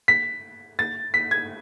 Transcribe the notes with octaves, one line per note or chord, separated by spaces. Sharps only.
B6
A6
B6
G#6